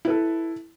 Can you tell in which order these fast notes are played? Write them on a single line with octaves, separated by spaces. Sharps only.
E4 B4 A4